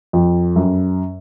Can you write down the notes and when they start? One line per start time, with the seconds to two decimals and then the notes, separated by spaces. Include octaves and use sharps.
0.13 F2
0.56 F#2